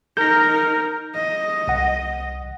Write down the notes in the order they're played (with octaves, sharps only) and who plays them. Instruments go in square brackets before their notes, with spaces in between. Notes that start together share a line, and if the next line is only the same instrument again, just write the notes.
[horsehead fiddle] D#4 A#4 [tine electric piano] G6 A#6
[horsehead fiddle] D#5
[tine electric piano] C2 F#5